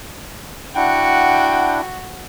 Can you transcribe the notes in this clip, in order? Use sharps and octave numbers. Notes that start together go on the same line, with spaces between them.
D4 E4 F#4 F#5 G5